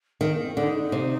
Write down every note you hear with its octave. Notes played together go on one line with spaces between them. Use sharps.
D#3 C4
A#3
C4
D3 D#4
C3